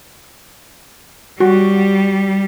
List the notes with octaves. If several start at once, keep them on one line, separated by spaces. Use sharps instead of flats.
G3 F#4